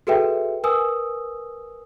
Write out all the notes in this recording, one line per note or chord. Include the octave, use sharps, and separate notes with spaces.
F#4 G#4 A4 B4 E5 G5
A#4 B4 G#5 D#6 E6